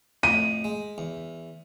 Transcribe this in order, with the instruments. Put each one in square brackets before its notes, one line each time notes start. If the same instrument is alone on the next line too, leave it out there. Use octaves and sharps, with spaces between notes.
[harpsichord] F2 A2 [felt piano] D#7
[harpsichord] G#3
E2